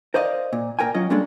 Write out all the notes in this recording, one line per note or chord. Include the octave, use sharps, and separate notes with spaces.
A#4 C5 D5 D#5 F5
A#2
A#2 A#4 G5 G#5
F#3 C#4 F4 D#5
G3 G#3 A#3 C#4 D4 A4